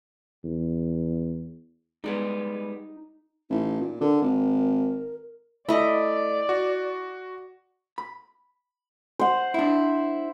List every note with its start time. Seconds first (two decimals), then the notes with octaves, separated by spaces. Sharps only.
0.44 E2
2.04 G3 G#3 B3 D#4
3.50 A1 D#4
3.81 A#2
4.01 D3 A#4
4.22 G#1
5.69 A3 E4 D5 D#5
6.49 F#4
7.98 B5
9.19 C5 F#5
9.54 D4 E4